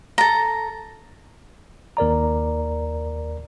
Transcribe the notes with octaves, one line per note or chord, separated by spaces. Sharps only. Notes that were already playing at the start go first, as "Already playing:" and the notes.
A4 A#5
D#2 A#4 D5 A#5